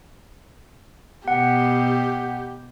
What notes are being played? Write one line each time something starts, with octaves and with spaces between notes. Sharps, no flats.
B2 G4 F#5